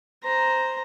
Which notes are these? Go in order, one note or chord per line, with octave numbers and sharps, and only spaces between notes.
C5 A#5